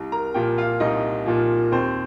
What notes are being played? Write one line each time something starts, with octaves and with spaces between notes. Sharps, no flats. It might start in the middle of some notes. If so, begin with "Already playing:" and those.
Already playing: C2
A#4 A#5
A#2 F3 G4 G5
F4 F5
C2 D#4 D#5
A#2 F3
D#2 C4 C5